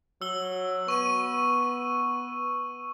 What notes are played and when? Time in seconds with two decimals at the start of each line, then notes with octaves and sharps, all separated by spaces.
0.22 F#3 E6 G7
0.88 B3 C#6 D#7